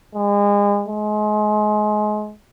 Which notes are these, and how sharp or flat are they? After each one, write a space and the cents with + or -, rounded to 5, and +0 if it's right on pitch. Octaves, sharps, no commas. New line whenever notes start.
G#3 -35
G#3 +30